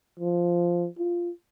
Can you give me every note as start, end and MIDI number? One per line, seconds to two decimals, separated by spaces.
0.20 0.87 53
0.98 1.30 65